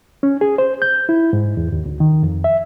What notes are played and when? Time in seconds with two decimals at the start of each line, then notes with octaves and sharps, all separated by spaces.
0.23 C#4
0.41 G#4
0.58 C5
0.82 G6
1.09 E4
1.33 G#2
1.57 E2
1.72 D#2
1.86 D2
2.00 D#3
2.23 F2
2.44 E5